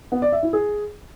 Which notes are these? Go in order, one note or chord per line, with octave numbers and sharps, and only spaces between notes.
B3
D5
E5
E4
G#4